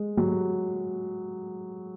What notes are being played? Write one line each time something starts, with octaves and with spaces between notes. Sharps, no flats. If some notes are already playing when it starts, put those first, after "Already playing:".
Already playing: G#3
F#3